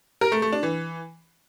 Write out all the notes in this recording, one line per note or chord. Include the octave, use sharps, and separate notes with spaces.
A#4
A3
A3
D4
E3